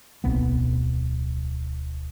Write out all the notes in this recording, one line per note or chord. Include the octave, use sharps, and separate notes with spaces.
D1 B1 B3 C4